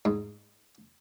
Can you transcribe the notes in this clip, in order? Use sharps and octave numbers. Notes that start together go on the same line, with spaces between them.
G#2